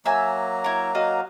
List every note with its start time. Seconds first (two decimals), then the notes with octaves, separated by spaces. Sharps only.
0.06 F#3 A#3 E5 G#5 A#5 E6
0.64 E4 A#4
0.95 F#4 D#5 F5